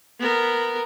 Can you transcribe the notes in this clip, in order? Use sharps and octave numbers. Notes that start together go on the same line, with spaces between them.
B3 A#4